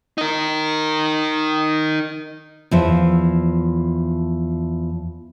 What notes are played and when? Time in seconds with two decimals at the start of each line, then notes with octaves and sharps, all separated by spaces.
0.18 D#4 A#4
2.71 E2 F3 E5